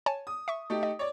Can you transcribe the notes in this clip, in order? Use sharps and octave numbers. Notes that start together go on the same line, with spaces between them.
C#5 G#5 A5
D#6
E5 C#6
A3 D#4 G4
D#5
C#5 D5